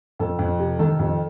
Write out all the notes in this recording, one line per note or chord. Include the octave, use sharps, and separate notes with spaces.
F2 A4
F2
C3
D#3 A4
F2